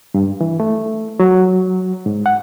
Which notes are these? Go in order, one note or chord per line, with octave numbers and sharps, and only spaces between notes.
G2
E3
A3
F#3
G#2
F#5